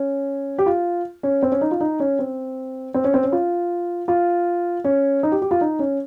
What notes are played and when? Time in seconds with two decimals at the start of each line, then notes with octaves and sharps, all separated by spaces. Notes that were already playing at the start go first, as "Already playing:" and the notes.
Already playing: C#4
0.58 G4
0.66 F4
1.23 C#4
1.43 C4
1.52 C#4
1.61 D#4
1.71 F4
1.81 D#4
2.00 C#4
2.19 C4
2.94 C4
3.04 C#4
3.14 C4
3.24 C#4
3.32 F4
4.08 F4
4.84 C#4
5.23 D#4
5.32 G4
5.42 G4
5.51 F4
5.61 D#4
5.79 C#4